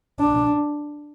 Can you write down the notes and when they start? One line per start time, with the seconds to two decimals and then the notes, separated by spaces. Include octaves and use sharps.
0.20 D4